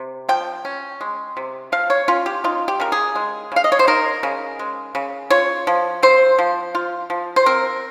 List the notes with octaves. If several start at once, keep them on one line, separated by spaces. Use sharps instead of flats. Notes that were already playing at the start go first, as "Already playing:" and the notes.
Already playing: C3
F3 G5
C#4
G#3
C3
F3 F5
C#5
C#4 F4
G4
D#4 F4
G4
C#3 A#4
G#4
G#3
C#3 F5
D#5
C#5
C5
D#4 A#4
C#3
G#3
C#3
F4 C#5
F3
C4 C5
F3
F4
F3
C5
C4 A#4